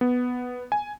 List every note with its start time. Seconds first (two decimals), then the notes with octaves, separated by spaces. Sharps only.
0.01 B3
0.72 G#5